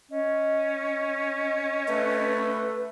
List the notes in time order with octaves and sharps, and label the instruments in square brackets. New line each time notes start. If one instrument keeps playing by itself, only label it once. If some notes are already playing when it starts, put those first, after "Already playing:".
[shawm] C#4 [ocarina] D#5
[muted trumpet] A3 [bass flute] B4